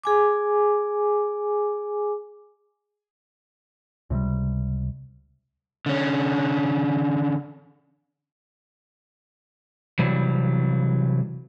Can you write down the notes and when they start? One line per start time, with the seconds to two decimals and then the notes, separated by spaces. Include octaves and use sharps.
0.04 G#4 G#5 D6
4.10 C#2 C3 E3 G3
5.86 D3 C#4
9.99 C3 E3 F#3 G3